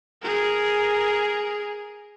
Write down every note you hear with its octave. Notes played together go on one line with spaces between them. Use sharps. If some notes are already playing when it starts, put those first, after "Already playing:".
G#4 A#4